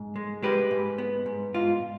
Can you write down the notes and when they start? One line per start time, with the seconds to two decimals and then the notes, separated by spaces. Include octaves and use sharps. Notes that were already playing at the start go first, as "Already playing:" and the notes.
Already playing: G#2
0.16 G#3
0.43 G#3 G4 B4
0.71 G#2
0.98 B3
1.26 G#2
1.54 G#2 F4